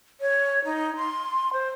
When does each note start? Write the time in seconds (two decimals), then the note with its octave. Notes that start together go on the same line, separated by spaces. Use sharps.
0.21 C#5
0.65 D#4
0.97 C6
1.53 C5